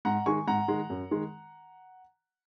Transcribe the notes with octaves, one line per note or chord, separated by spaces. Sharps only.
G#2 F#5 A#5
D#3 G#3 G#5 C#6
G#2 F#5 A#5
D#3 G#3
F#2
D#3 G#3